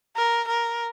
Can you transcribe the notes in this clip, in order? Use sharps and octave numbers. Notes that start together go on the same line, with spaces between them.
A#4
A#4